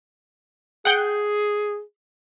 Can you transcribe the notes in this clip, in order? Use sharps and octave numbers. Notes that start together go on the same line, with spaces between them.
G#4 F#5 G5 G6